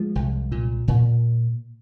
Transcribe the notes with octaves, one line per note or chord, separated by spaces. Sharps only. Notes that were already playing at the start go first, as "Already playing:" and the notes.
Already playing: F3 G#3
C2
A#2
A#2